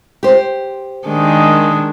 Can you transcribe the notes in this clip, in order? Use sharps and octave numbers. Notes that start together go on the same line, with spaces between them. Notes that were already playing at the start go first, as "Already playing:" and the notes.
G4 C5
D#3 G#3 D4